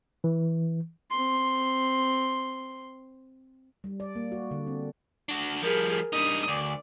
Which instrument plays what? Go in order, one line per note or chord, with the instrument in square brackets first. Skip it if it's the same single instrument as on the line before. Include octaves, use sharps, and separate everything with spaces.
[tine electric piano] E3
[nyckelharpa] C4 C6
[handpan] G3
D5
A#3
F#4
D3
C4
[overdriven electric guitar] D4 F#4
[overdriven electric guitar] F3 G3 [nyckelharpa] G#4 A#4
[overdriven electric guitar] G3 D#4 [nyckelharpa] D4 D#6
[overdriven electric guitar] D2 [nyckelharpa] D5